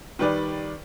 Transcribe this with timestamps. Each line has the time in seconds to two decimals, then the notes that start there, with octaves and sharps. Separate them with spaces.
0.19 D#3 G3 B4 D5